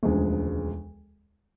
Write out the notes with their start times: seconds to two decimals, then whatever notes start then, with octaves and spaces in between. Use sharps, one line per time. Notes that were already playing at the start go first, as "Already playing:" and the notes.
0.03 E1 D2 C#3 F3 G#3